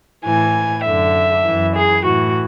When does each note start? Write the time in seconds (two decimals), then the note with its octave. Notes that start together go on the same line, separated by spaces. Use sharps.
0.25 A2 E3 G#5
0.85 F#2 D3 E5
1.45 F#2 E3
1.74 G#4
2.05 A2 E3 F#4